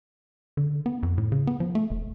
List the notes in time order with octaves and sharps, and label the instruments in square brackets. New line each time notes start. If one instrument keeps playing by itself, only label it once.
[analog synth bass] D3
B3
F2
A2
C#3
B3
F3
A3
E1